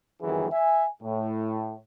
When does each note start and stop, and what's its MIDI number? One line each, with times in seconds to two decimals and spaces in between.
0.22 0.47 31
0.22 0.47 42
0.22 0.47 51
0.22 0.47 52
0.22 0.47 68
0.52 0.86 76
0.52 0.86 80
1.03 1.76 45